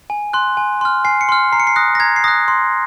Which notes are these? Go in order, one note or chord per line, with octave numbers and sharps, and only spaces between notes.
G#5
C6 F#6
G#5
C6 F6
G#5 C7
C#7
C6 F6
A#5 C7
C#7
C7
D#6 F#6 A#6
A#6
A#5 G#6
C7
D#6 F#6 A#6
C6